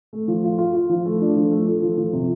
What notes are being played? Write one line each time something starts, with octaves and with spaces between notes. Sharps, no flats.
A3
F3
F4
F4
F4
F3
A3
D4
F3
A3
A3
F3
F3
C3